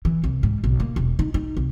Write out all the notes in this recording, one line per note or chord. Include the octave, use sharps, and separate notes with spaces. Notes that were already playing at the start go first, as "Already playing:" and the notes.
E3
C2
G#2
B1
A#3
E1
D#4
D#4
C2